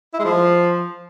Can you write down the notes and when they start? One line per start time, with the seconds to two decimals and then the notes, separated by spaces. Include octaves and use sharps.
0.14 E4
0.19 G#3
0.25 F3